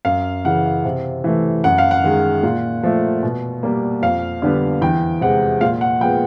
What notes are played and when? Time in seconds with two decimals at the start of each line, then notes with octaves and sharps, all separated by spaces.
0.05 F#2 F5
0.45 C#3 E3 F#5
0.85 C3
1.24 E3 A3
1.64 F#2 F#5
1.78 F5
1.91 F#5
2.04 D#3 G#3
2.43 A#2
2.83 F3 A3
3.23 B2
3.63 G3 A#3
4.02 F2 F5
4.42 D3 G3 B3
4.81 E2 G5
5.21 C3 E3 G#3 F#5
5.61 A#2 F5
5.81 F#5
6.01 F3 G#3 B3 G5